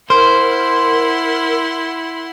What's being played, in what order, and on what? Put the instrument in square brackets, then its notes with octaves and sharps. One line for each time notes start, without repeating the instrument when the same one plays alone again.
[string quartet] E4 F#5 C6 [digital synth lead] A#4 [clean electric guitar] C5